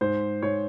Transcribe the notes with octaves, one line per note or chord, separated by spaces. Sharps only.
G#2 C5
G#2 C#5